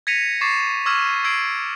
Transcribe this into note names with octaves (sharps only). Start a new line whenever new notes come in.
G#6 A#6 B6 C#7 D#7 F7
C#6 D6 A6 C7 E7
C#6 D6 E6 F6 G#6 E7
E6 G#6 C7 D7